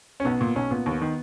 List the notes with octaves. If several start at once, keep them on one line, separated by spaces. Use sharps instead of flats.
C#4
B1 B3
A#2
B1 C#4
A#2 B3
D#2
D#3